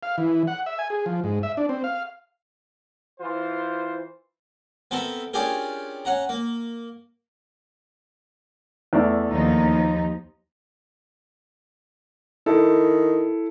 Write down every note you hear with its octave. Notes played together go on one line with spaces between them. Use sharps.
F5
E3
F#5
E5
G#5
G#4
F3
G#2
E5
D4
C4
F5
E3 F4 C5
B3 C4 A4 A#4 E5
C#4 D4 F4 G4 G#4 A#4
C#4 F#5 A#5
A#3
E2 A3 D5
D#2 F3 D#4
D#3 E4 A4